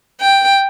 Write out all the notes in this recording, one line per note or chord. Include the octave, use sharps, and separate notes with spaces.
G5